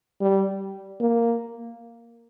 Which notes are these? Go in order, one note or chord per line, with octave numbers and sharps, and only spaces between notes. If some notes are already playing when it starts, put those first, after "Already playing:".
G3
A#3